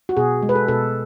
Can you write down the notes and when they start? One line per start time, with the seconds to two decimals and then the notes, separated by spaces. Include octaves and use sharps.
0.09 F#4
0.17 B2 G#4
0.42 G#3
0.49 B4
0.55 A4
0.68 B2 A4